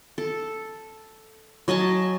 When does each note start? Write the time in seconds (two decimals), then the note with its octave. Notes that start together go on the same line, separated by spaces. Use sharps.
0.18 A4
1.68 F#3 D#5 G#5 A5